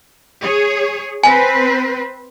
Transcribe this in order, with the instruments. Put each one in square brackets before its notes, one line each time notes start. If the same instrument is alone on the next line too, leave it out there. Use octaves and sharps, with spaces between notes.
[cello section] G#4 C#5
[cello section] C4 B4 C5 [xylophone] G#5